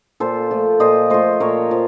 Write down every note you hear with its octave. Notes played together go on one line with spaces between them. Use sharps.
A#2 A4 C5
F3 A3
A#2 C5 D#5
F3 A3 C5 D#5
A#2 A#4 C#5
F3